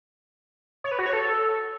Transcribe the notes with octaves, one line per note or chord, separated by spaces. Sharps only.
C#5
B4
F#4
C#5
A4